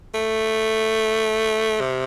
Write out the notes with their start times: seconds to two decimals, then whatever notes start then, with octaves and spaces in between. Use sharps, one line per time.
0.14 A3
1.80 C3